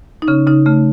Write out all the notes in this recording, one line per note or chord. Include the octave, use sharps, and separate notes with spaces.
D#4
C#3 C#4
C#3 D#4
C#3 A3